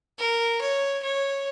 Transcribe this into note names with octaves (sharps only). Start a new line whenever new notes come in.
A#4
C#5
C#5